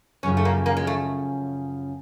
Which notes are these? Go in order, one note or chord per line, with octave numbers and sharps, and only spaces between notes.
F#2 C#3 F3 C#4
A3
A#3
A#3
G#3
A3